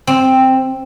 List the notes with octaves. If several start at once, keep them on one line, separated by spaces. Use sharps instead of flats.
C4